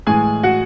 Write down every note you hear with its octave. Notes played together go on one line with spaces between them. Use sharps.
A2 E3 G#3 G#4 G#5
F#4 F#5